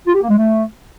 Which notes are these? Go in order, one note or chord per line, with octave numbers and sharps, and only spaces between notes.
F4
G4
A#3
G#3
A3